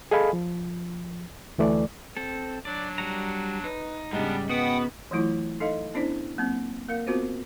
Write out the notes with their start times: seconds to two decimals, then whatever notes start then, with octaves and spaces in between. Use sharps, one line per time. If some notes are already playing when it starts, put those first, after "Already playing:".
0.11 G#4 A4 D#5 F5 G#5 B5
0.33 F3
1.58 D2 E3 A3 D5
2.17 C4 A4
2.65 F#3 D4 D5
2.98 G3 F#4 A#5
3.64 D#4 B4
4.13 G#2 C#3 G3 B3 D4
4.50 B3 F#4 F#5 G5 D#6
5.11 E3 F#3 A3 E4 F4
5.60 D#4 A4 D#5 F5
5.94 B3 C#4 D4 E4 C5 D5
6.37 F#3 A#3 C4
6.88 A#3 A#4 F5
7.07 B3 C4 F4 F#4 A#4 C5